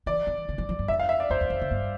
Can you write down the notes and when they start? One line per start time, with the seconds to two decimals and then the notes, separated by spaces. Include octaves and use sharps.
0.06 E3 D5
0.27 E3
0.49 D3
0.58 F3
0.69 F3
0.79 G2
0.88 F2 E5
0.99 F5
1.09 E5
1.20 D5
1.30 F2 C5
1.41 E2
1.50 F2
1.61 D3
1.71 G2